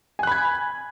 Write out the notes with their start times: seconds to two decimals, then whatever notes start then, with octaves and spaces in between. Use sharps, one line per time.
0.19 G#5
0.23 F#6
0.27 B5
0.32 G#6